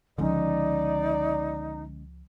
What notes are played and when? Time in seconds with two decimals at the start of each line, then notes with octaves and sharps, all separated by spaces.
0.18 C#2 D3 F3 G#3 C#4 D#4 D5